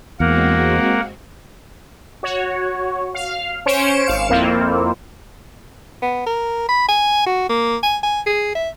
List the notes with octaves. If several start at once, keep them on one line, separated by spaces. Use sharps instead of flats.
E2 G#3 A#3 C4 F#4 A#4 F#5
F#4 C#5
F5 F6
C#4 C5 C#5 C#7 D7 E7
G#1 F5 C#7 E7
F2 A#3 C4 E4 F4
B3
A#4
B5
G#5
F#4
A#3
G#5
G#5
G#4
E5